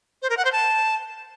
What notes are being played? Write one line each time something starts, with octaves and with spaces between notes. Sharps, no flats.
C5
A#4
F#5
C5
A5